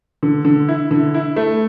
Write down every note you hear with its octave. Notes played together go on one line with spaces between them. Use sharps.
D3
D3
E4
D3
E4
A3